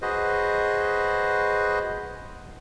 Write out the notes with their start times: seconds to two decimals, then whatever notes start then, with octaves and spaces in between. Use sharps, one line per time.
0.02 F#4 G#4 B4 C5 D#5